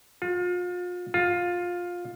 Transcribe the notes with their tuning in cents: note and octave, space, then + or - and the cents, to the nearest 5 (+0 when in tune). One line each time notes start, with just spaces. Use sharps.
F4 +35
F4 +15